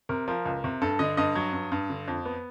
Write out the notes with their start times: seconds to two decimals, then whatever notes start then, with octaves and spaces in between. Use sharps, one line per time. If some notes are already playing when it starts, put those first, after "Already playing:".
0.09 C3 A#4
0.28 F3 A#4
0.46 C#2
0.64 C3
0.82 G2 A4
0.99 D3 D#5
1.17 G2 D#5
1.35 F#3
1.53 G2
1.72 G2
1.90 D3
2.08 F2
2.25 B3